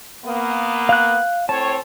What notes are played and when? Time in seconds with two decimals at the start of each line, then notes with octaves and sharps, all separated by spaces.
0.25 A#3 B3
0.89 F5 F#6
1.49 A2 C4 C#5 A5